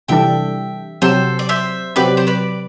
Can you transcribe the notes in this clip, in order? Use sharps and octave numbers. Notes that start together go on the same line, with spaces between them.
C3 E3 G3 D4 A4 E5 G5
C3 F#3 C4 G4 A4 C5
D5
C5 E5
C3 F#3 C4 G4 B4 D5
C5
B4 D5